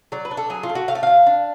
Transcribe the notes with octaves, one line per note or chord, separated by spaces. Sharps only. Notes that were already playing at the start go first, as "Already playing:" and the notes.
F#3 D5
B4
D4
A4
F#3 G#4
F4
A3
F#4
A3 F5
D5
D4 F5
D4